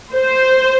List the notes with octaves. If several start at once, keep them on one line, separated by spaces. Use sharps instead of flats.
C5